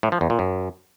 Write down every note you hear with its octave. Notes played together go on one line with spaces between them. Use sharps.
A2
F3
E2
A#2
F#2